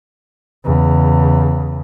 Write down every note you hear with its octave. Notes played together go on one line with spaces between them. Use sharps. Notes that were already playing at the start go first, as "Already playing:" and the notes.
E2 C#3